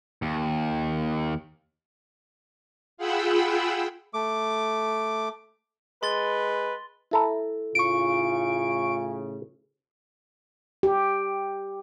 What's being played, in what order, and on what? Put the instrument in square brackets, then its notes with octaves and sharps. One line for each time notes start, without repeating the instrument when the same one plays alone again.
[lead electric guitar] D#2
[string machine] F4 G#4 F#5 G5 B5 E6
[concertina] A3 D6
[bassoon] G#3 [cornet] B4 [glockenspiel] C6 A6 G7
[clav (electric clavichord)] E4 A4 A#5
[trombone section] A2 C#3 [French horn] F4 [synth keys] C#6 D7
[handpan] G4